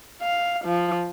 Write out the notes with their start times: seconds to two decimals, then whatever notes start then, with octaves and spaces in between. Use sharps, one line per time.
0.22 F5
0.65 F3